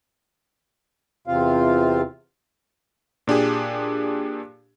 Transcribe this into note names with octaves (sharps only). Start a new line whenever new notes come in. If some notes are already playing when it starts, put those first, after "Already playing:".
E2 C3 C4 F4 F5
A#2 D4 G4 G#4